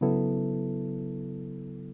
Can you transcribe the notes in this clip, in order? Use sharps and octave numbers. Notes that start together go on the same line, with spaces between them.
C#3 F#3 B3 E4 A4